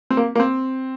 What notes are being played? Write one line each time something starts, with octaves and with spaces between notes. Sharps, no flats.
C4
A#3
A#3
C4